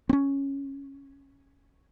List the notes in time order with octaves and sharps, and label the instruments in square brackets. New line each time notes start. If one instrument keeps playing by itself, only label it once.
[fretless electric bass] C4 C#4